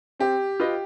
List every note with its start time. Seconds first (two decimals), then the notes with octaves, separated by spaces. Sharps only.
0.20 C4 G4
0.60 F4 B4 D#5